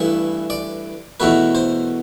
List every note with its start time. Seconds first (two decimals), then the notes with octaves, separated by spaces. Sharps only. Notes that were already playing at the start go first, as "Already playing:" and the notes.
Already playing: G2 E3 A3 E5
0.50 D5
1.20 E2 B2 A3 B4
1.55 C5